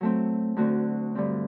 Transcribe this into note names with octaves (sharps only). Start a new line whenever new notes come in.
F#3 A3 C4
D2 D3 A3 C4 F#4
G2 D3 G3 C4